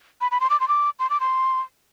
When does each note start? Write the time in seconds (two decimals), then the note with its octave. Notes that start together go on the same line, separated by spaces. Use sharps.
0.21 B5
0.31 B5
0.40 C6
0.50 D6
0.60 C6
0.68 D6
0.99 C6
1.10 D6
1.20 C6